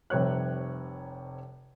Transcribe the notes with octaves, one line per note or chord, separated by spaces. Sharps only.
F1 C3 G3 C#5 F#6